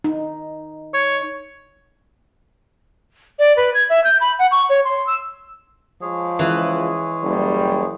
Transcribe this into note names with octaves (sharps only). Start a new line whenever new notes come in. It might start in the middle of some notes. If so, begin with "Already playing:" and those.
D#4
C#5
D5
B4
G#6
E5
G6
B5
F#5
C#6
C#5
C6
E6
F3 G#3 G#4 C#5
C#2 E3 B4
F#1 G3